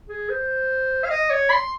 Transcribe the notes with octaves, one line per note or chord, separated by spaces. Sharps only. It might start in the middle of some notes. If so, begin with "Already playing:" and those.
G#4
C5
F5
D#5
C#5
C6